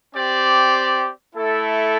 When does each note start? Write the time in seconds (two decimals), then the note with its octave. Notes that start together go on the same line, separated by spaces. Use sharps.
0.13 C4 G4 D5
1.34 A3 E4 A4